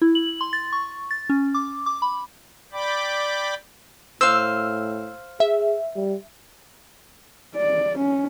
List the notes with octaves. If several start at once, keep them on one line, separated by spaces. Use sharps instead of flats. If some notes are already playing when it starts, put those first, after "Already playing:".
E4
F#7
C6
A6
C#6
A6
C#4
D6
D6
B5
D5 G5 B5 D6
A2 C5 F5 E6
G#4 E5
G3
D5
C#4